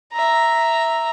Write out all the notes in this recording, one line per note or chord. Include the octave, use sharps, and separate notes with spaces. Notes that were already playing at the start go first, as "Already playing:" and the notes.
E5 A#5